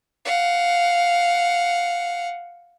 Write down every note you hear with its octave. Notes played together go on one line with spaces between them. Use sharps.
F5 F#5